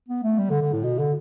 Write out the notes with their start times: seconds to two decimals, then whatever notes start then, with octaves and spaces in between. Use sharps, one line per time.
0.09 B3
0.23 A3
0.38 G3
0.50 D3
0.61 D3
0.73 A2
0.84 B2
0.99 D3